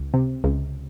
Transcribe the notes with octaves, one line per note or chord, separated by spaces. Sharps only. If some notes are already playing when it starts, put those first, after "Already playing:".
Already playing: C#2
C3
C#2